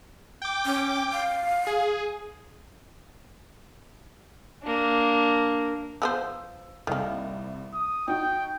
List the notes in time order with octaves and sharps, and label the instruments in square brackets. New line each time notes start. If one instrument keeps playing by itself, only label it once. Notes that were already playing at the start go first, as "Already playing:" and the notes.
[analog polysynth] G5 D6
[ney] C#4
F5
[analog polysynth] G#4
[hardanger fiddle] A#3 D4
[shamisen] F3 B3 C5 [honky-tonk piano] E6
[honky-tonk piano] C2 C3 [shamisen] D#3 A#3
[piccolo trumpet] D#6
[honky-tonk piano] D#4 F#4 [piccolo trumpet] G5